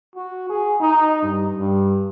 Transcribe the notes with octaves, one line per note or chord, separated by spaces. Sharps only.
F#4
G#4
D#4
G2
G2